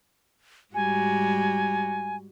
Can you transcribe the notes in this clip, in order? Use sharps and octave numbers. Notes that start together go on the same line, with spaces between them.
G#2 G3 F#4 G#5